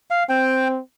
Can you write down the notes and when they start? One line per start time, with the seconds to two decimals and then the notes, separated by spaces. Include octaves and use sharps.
0.10 F5
0.29 C4 G5